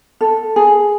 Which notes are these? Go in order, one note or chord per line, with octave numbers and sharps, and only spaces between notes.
A4
G#4